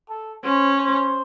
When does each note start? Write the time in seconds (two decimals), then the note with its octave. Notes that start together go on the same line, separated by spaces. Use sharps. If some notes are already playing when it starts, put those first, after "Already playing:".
0.10 A4
0.44 C#4 C5
0.78 C5